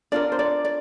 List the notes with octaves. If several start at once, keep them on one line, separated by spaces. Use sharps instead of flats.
D4 F4 A#4 D5
C5
D5
D5